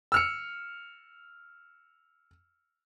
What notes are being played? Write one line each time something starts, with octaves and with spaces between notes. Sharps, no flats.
E6 F6 C#7